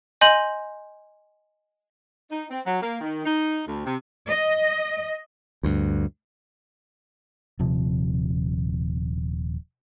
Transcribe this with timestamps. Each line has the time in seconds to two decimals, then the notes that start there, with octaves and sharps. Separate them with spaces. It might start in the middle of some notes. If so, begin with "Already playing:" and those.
0.21 D#5 G#5 C6 G6 F#7
2.30 D#4
2.51 C4
2.65 F#3
2.82 A#3
3.01 D#3
3.25 D#4
3.66 D2
3.84 C3
4.29 D#5
5.63 D2 G2
7.59 D#1 C3 F3